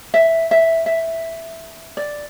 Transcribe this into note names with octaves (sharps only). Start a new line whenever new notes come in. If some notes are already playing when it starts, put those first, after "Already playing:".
E5
E5
E5
D5